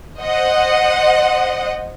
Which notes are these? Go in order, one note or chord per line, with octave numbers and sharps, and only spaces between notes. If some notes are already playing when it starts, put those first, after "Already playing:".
C5 D#5 F#5